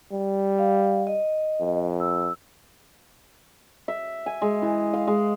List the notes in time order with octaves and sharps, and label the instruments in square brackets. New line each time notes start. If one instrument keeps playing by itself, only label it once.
[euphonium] G3
[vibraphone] F5
D#5
[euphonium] F2
[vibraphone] E6
[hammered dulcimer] E5
G#5
G#3
E3
F5
G#3